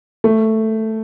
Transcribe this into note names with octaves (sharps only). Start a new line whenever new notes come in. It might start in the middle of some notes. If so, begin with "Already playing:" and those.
A3